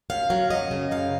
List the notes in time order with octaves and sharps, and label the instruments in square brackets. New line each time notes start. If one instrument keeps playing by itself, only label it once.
[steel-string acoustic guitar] F#2 F5
F#3
F#2 D#5
C#3
F#2 F5